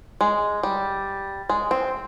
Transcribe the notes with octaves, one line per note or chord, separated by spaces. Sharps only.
G#3
G3
G#3
C4